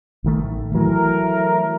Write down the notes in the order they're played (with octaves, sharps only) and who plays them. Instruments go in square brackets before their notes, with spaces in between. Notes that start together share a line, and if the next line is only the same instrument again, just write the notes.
[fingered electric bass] A1 D#3 A3
[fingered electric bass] E3 F#3 [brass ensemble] A3 E4 A#4